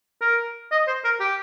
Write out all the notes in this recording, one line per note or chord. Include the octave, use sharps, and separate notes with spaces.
A#4
D#5
C5
A#4
G4